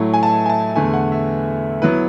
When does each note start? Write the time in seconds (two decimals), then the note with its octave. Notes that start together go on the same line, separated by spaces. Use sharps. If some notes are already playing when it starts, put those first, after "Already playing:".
Already playing: A2 F#3 A3 E4
0.13 G#5
0.23 A5
0.46 G#5
0.50 A5
0.75 E2 D3 A3 G#5
0.94 F#5
1.12 E5
1.82 F#3 B3 E4 B4